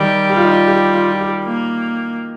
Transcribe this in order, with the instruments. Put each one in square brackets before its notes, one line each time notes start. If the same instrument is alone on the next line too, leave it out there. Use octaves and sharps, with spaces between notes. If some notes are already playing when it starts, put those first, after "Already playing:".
Already playing: [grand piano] D#3 [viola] G3
[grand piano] G4
F4
D#4
F4
G4
F4
F4
G4
[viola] A#3